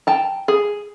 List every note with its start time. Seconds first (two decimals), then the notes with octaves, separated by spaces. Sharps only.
0.07 G5 A5 A#5
0.48 G#4